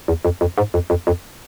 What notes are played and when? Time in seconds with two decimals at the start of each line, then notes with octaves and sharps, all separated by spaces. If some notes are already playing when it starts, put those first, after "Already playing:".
0.08 E2
0.25 F2
0.41 F2
0.58 G#2
0.74 F2
0.90 F2
1.07 F2